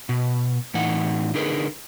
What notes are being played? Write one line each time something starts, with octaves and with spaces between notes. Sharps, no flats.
B2
A2 E3 D#4 F#5
D3 D#4 G#4 A#4 B4